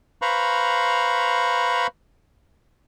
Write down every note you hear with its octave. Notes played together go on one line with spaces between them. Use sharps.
B4 C5 F5 A#5 B5 C#6